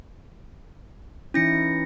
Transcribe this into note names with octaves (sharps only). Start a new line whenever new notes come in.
E3 C#4 D#4 E4 A#6 C#7